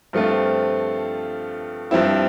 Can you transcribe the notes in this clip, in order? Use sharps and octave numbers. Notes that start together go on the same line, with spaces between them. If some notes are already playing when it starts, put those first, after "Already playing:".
G2 F3 A3 C4 F4
G2 F3 C4 E4